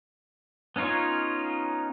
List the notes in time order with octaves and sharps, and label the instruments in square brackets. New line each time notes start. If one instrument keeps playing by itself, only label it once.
[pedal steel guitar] B3 C#4 D#4 F4 C#5